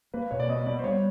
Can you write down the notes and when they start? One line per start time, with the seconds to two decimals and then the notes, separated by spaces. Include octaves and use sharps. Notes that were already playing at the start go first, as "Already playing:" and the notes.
0.14 A#3 B4
0.31 B2 C#5
0.40 D5
0.48 B3 D#5
0.66 B3 D5
0.79 C5
0.83 G3 C#5